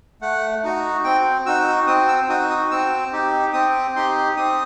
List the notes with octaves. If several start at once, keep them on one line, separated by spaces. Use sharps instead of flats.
A3 F#5
D#4 F#4
C4 G5
D#4 F#4 E6
C4 D#6
E6
D#4 F#4 D#6
D#6
C4 E6
D#4 G4
C4 D#6
D#4 G4 C6
C4 D#6